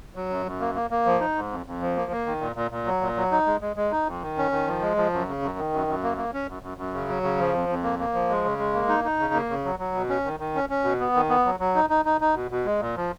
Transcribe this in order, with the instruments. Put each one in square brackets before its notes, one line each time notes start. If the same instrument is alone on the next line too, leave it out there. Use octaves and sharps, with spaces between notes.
[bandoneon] F#3
F#2
F#2
A#3
A#3
A#3
F3
D#4
G#2
F2
F2
F3
A#3
A#3
D#3
A#2
A#2
A#2
F#3
A#2
F#3
D#4
G#3
G#3
G#3
D#4
F2
D#3
C#4
D#3
F3
G#3
F3
F#2
C#3
F#2
D#3
F#2
F#2
A#3
A#3
C#4
F#2
F#2
F#2
C#3
F#3
C#3
F3
F2
F2
A#3
A#3
F3
G#3
C#3
G#3
A#3
D#4
D#4
C#3
A#3
C#3
F#3
F#3
B2
C#4
D#3
D#3
C#4
C#4
B2
B3
D#3
B3
F#3
F#3
D#4
D#4
D#4
D#4
B2
B2
G#3
A#2
F3